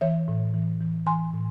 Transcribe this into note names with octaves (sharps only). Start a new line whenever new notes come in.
E3 C#5 E5
A2
E3
E3
E3 G#5 C6
A2